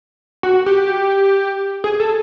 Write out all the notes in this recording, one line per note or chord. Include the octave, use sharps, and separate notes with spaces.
F#4
G4
G#4
A4